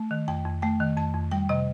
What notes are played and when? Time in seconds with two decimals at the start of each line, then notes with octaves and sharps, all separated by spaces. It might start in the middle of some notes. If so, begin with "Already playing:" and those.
Already playing: A3
0.11 D#3
0.28 F2 G5
0.45 F2
0.62 A3 G5
0.80 D#3
0.97 F2 A5
1.14 F2
1.31 G3 G5
1.49 C3 D#5